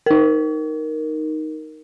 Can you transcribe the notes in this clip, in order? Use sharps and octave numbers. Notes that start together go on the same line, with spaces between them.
D#4 A#4